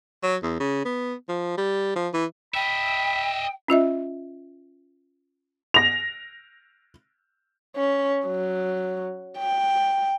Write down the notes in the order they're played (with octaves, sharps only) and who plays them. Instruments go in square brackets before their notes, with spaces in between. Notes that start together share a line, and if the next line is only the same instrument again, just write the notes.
[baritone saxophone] F#3
E2
C#3
B3
F3
G3
F3
E3
[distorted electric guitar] D#5 E5 [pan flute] G5 [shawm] B5
[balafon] C#4 F4 D#5 E5
[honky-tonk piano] A#6 F7
[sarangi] C#4
F#3
G5